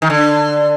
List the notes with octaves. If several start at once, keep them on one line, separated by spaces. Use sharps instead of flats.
D#3
D3